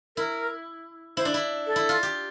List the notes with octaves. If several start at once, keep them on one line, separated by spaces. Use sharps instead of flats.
E4 A#4
E4 C5
D4
E4
A4
E4
F4
G4